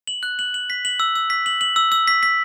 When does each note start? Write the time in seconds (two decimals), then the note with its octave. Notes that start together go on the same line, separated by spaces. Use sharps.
0.07 F#7
0.23 F#6
0.39 F#7
0.54 F#7
0.70 B6
0.85 F#7
1.00 E6
1.15 E6
1.30 B6
1.46 F#7
1.61 F#7
1.76 E6
1.92 E6
2.08 B6
2.23 B6